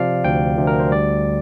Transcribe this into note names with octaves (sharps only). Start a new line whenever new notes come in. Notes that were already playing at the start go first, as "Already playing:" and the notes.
Already playing: C3 F3 D5 F5
D2 G5
D2
A#4
C5
G3 D5